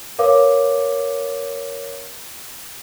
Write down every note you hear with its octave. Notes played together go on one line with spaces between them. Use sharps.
A#4 B4 C#5 F5 D6